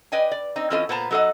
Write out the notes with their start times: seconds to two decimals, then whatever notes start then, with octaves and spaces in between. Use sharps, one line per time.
0.12 B4 D5 D#5 G5 G#5
0.31 D5
0.56 C4 D#4
0.70 E3 C4 C#4 F4 A4 D#5
0.89 A#2 B3 C5 A5 A#5
1.11 F#3 D#4 A4 C5 D#5 F#5